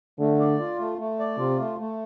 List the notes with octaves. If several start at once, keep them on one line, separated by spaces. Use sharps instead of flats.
D3 A3
D5
F4
A3
A3
D5
C3 F4
A3
A3